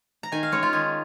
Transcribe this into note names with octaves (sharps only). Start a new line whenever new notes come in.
A#5
D#3 G#5
F5
G#3 C#4 C#5
F4
D#3 G#4